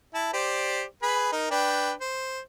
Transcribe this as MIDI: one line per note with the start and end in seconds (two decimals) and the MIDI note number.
0.15 0.29 64
0.15 0.29 81
0.34 0.83 67
0.34 0.83 72
0.34 0.83 74
1.03 1.28 68
1.03 1.28 71
1.03 1.28 83
1.32 1.47 63
1.32 1.47 70
1.51 1.92 62
1.51 1.92 71
1.51 1.92 79
2.01 2.40 72